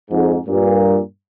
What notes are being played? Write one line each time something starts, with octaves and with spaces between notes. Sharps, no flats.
F2 G#2
G2 A#2